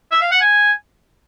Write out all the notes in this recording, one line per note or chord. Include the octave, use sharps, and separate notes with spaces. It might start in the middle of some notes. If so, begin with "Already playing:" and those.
E5
F5
F#5
G#5